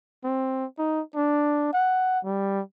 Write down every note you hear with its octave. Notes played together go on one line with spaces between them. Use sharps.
C4
D#4
D4
F#5
G3